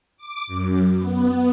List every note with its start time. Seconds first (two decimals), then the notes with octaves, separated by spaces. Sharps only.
0.17 D6
0.47 F#2
0.98 B3